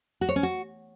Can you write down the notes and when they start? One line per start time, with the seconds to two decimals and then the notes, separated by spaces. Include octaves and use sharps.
0.21 F#4
0.29 C#5
0.36 C#4
0.43 F#4